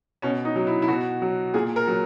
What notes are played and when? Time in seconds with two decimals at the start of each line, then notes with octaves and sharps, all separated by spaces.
0.22 B2 C#4
0.45 D#4
0.56 F#3
0.67 E4
0.82 E4
0.88 B2 F#4
1.22 F#3
1.54 A#2 G#4
1.76 A#4
1.87 F#3